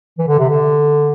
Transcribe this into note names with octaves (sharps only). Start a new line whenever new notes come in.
E3
D3
C3
D3